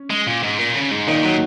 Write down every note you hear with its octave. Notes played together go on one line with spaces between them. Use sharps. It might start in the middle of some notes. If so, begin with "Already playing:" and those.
Already playing: C#4
G#3
A#2
G#2
A#2
C#3
G#2
A#2 D#3 D#4
A#2 F#3 F#4